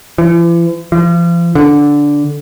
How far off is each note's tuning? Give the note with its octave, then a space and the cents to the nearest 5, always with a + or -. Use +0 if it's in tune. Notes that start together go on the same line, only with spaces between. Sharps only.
E3 +45
F3 -40
D3 -10